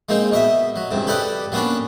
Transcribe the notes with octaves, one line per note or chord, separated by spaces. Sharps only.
G#3 A#3 C4 D#4
B2 D#5 E5
F#3
C#2 G2 C3
G4 A4 B4 D5 D#5
F#3 A#3 B3 C#4 D4